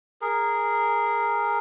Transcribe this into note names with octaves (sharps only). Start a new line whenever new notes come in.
G#4 A#4